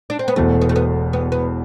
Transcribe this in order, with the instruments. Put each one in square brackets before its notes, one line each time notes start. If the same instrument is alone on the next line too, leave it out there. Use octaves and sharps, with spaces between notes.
[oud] D4
C4
B3
[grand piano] E1 E2 B2 [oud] A3
[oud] B3
A3
B3
B3
B3